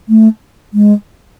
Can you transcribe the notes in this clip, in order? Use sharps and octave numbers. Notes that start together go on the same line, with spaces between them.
A3
G#3